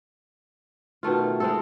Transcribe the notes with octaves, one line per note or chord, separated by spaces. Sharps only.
B2 D#3 A3 F4
G#3 C4 A4